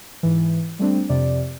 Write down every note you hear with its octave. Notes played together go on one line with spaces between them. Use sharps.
G#2 E3
G3 A3 C4 D4
F2 C3 D5